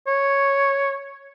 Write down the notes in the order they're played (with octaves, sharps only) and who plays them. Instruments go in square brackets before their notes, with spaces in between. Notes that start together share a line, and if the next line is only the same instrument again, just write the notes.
[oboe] C#5